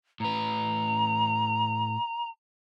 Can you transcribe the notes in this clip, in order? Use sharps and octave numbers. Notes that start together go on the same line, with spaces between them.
A2 B4 A#5